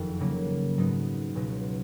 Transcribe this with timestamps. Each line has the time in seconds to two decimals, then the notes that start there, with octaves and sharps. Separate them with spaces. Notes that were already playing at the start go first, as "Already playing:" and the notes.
Already playing: F#1 F2 D#3
0.20 C#3 F#3 A#3 C#4
0.78 G#2 F#3 B3 D#4
1.35 C#2 B2 F#3 C#4